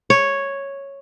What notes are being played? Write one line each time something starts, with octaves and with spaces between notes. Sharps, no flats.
C#5